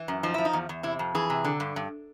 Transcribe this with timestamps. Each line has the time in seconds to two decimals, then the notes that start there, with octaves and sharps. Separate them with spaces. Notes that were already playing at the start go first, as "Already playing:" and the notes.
Already playing: E3
0.08 F#2
0.23 F3 D#4
0.34 F3 E4
0.45 D#4
0.53 E2
0.69 E2
0.83 C3 E4
0.99 F2
1.15 E3 G#4
1.30 C3
1.44 D3
1.60 G2
1.76 G2